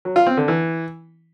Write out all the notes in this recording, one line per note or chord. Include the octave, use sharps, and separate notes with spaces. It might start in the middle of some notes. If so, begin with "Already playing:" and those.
F#3
F4
C4
D3
E3